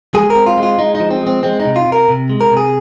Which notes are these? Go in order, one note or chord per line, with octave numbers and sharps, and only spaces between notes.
G#3 G#4
A#4
C4
F4
G#3
F4
G#3 D#4
D#4
F3
C4
G#3
C4
G#3 C4
D#4
C3
F4
C3
A#4
C3
G#3
A#4
C3
G#4